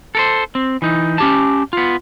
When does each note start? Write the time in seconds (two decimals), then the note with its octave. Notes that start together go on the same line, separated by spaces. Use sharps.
0.15 A4 A#4 C5
0.55 C4
0.82 E3 D#4
1.18 C#4 G4 A5
1.73 B3 F4